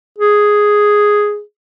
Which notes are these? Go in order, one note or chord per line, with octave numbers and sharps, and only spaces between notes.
G#4